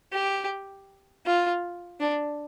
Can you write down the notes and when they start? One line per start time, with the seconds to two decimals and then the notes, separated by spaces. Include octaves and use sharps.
0.13 G4
1.26 F4
2.00 D4